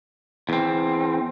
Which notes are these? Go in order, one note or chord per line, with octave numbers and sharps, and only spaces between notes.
E2 C4